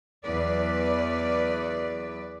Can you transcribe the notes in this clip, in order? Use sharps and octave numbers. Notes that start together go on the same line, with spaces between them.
E2 F#3 B4 D5